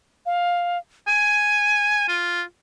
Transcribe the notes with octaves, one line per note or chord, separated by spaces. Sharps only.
F5
G#5 D#7
F4